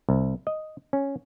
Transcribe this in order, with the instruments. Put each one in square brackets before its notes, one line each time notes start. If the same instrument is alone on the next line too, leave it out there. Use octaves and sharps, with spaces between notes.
[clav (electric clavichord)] C2
D#5
C#4